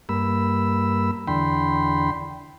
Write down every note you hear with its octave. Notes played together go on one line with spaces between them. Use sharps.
G2 A#3 B5 E6
E2 D3 G5 B5 C6